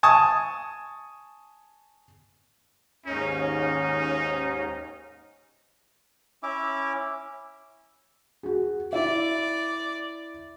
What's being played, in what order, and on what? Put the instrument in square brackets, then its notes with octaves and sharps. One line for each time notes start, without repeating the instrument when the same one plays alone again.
[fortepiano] G#5 A5 C#6 D#6
[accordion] D#2 G#2 C#4 [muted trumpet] D#4
[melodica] C#4 E4 E5 D6
[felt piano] F#4 G#4
[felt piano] E4 E5 [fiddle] D5